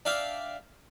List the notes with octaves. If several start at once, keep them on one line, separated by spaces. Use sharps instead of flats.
D4 E5 F5 G5